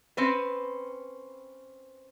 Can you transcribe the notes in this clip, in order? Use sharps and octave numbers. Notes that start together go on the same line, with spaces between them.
C4 C#4 B4